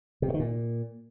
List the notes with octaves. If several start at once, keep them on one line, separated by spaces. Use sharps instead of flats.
C3
G2
D#3
A#2